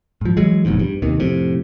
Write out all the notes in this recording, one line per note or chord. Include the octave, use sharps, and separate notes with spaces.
G#2 F3
E3 F#3 G#3
F1 A#1 E2 G#2
G2
D#2 C3 D#3
F2 A2 C3